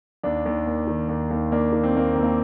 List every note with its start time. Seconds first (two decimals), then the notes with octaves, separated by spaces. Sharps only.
0.23 D#2 D4
0.46 D#2
0.67 A#3
0.87 D#3
1.09 D#2
1.30 D#2
1.52 A#3 D4
1.73 D#3
1.83 C4
1.95 D#2 A#3
2.15 D#2
2.23 A#3